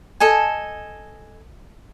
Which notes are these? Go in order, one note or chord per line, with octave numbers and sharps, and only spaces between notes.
A4 D#5 G#5